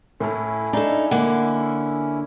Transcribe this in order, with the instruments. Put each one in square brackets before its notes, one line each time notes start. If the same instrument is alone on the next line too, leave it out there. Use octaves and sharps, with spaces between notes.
[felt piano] A2 A3 [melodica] C#4 E4
[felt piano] D4 [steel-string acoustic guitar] D#4 A4
[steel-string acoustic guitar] D3 A#3 [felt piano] F#5